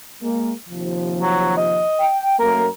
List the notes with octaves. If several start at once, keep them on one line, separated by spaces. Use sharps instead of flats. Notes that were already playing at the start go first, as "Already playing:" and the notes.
G#3 A#3
D#2 C3 F3
F#3
D#5
G5
F#2 A3 A#3 A#4